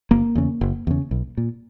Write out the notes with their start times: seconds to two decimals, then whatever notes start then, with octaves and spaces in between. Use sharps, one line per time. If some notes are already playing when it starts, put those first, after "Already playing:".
0.11 F#1 A#3
0.35 E2 C#3
0.61 F#1
0.87 E2 C#3
1.11 B1
1.38 A#2